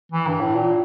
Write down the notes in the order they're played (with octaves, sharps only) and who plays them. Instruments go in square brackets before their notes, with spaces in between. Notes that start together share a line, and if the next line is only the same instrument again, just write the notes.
[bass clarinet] E3
G2
A2
A#2